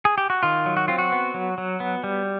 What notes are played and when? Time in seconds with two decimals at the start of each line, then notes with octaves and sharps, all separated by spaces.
0.05 G#4
0.18 G4
0.30 F#4
0.43 D#3 F4
0.66 F#3
0.77 F#4
0.88 C4 F4
0.98 F#4
1.12 B3
1.34 F#3
1.58 F#3
1.80 B3
2.04 G3